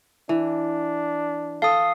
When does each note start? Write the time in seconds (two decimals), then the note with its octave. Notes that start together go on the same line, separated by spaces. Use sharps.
0.29 E3 D4
1.62 A4 F5 D#6